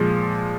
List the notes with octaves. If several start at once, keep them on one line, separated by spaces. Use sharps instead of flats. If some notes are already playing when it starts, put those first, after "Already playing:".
Already playing: A#2 F3 G#3